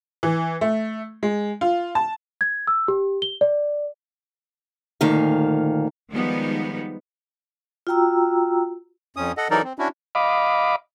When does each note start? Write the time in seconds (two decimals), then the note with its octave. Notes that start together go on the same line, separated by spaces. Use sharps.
0.23 E3
0.61 A3
1.23 G#3
1.61 F4
1.95 A5
2.41 G#6
2.67 E6
2.88 G4
3.22 G7
3.41 D5
5.01 D2 A#2 D#3 F5
6.10 D#3 F3 G3 G#3 B3 D#4
7.87 F4 F#4 G5 A#5 E6
9.16 F2 C#4 D#6
9.37 A4 D#5 F#5
9.51 E3 F#3 D#4 A4 A#4 D5
9.64 C4
9.79 C#4 D4 E4 F#4
10.15 D#5 F5 B5 D6